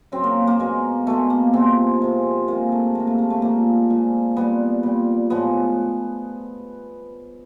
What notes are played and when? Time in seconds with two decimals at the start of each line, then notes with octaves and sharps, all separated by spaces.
0.12 C#3 F#3 C4
0.24 A#3
0.47 A#3
0.60 B2 G#3
1.07 B2 G#3 A3
1.30 A#3
1.53 C3 F3 G#3 C4
2.02 C3 F3 G#3
2.48 C3 D#3 G#3 A#3
2.72 A3
2.95 C3 D#3 G#3 A#3
3.07 A3
3.18 A#3
3.30 A3
3.42 A#2 F3 G#3 A#3
3.90 A#2 F3 G#3
4.36 A#2 G3 B3
4.83 A#2 G3
5.30 A2 F3 G#3 B3